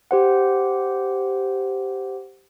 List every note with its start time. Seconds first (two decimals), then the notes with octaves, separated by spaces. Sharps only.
0.11 G4 C5 F#5